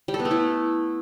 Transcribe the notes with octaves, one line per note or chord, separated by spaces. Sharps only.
G3
A4
B3
A3
E4